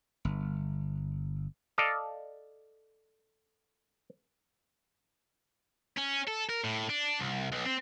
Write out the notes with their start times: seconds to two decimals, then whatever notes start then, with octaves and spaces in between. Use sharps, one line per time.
0.25 G1
1.78 A4 D5 D#5 F5
5.97 C#4
6.27 A4
6.49 A#4
6.64 A2
6.90 D4
7.19 C2
7.52 B1
7.65 C4